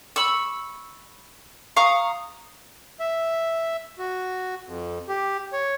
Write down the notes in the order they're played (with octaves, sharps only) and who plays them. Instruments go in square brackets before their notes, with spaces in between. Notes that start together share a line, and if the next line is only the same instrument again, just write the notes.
[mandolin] B5 C#6 E6
F5 A#5 C#6 D#6
[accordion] E5
F#4
F2
G4
C#5